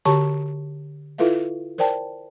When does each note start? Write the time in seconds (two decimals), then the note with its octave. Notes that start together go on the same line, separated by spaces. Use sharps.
0.05 D3 F#4 G4 C#5 A5 C#6
1.18 E4 F4 A4 B4 E5 F5
1.78 A#4 C5 D5 G5 A5